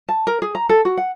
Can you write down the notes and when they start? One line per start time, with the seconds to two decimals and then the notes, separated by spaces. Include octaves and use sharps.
0.09 A5
0.27 A#4
0.42 G#4
0.55 A#5
0.69 A4
0.85 F#4
0.97 F#5